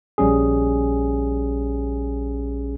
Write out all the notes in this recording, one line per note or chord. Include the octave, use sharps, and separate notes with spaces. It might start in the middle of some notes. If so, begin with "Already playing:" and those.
A#1 G3 C#4 G#4